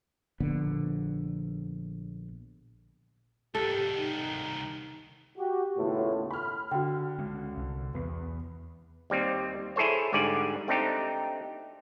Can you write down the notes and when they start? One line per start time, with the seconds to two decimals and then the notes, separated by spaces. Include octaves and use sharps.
0.40 A#1 D3 B3
3.55 C2 D#3 G4 A4
3.96 D#4
5.38 F#4 G4
5.77 D#2 A2 C#3 A3 B3 F4
6.31 B5 F6
6.71 D3 F#4 G5
7.19 G#3 C#4
7.58 C2
7.95 E2 B3
9.10 D#2 G3 C4
9.76 E4 G#4 A4 C5 C#5
10.13 G#2 D3 G3 D5 G#5
10.68 A3 C4 D4 D#4 G4